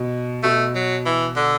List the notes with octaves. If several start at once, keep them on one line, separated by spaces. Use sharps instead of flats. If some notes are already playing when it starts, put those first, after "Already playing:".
Already playing: B2
B2 A3
F#3
E3
D3